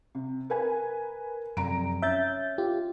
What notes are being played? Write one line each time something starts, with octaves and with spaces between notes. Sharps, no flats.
C3
A#4 B4 G#5
F1 F#2 A#5 D7
C#4 E5 G6 A6
F4 G4